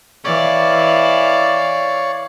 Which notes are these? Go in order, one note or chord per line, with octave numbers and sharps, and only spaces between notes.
E3 C#5 D5 F5